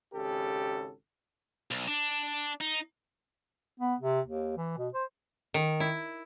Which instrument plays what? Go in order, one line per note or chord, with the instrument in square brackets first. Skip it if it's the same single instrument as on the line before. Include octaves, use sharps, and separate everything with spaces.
[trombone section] G#1 C#3 G4 A4
[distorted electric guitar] B1
D4
D#4
[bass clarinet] B3
C3
D#2
E3
B2
C5
[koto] D#3
E4